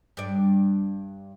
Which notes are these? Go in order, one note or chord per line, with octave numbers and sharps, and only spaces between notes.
G2 D5